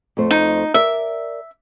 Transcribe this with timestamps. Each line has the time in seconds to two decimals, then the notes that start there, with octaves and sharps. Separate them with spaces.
0.17 F2 A3 C5
0.31 D#4
0.74 A#4 D5 E5